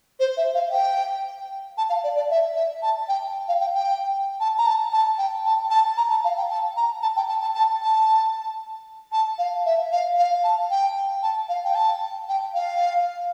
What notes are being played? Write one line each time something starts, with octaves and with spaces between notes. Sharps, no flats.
C5
E5
F5
G5
A5
F5
D5
D5
E5
E5
A5
G5
F5
G5
G5
A5
A#5
A5
A5
G5
A5
A5
A#5
A5
F5
G5
A5
A#5
A5
G5
A5
A5
A5
A5
A5
F5
E5
F5
F5
A5
G5
A5
F5
G5
A5
G5
F5